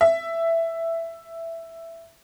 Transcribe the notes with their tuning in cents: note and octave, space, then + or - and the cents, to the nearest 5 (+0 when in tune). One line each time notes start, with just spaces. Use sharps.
E5 +10